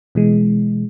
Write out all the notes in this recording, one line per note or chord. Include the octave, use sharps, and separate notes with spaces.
B2 E3 G#3